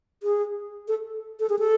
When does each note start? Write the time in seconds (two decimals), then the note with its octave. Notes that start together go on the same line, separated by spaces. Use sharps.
0.23 G#4
0.88 A4
1.40 A4
1.49 G#4
1.59 A4